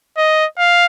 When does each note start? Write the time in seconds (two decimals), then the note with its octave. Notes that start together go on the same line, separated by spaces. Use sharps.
0.17 D#5
0.58 F5